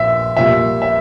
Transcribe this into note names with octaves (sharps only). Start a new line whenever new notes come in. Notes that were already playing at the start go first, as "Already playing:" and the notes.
Already playing: A#1 A#2 E5
A#1 A#2 G3 E5
E5